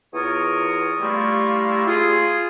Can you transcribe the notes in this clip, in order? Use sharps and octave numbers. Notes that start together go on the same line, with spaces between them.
E2 F4 A#4 C#5 D#6
G3 A3 A#3 E4 F4
F4 G#4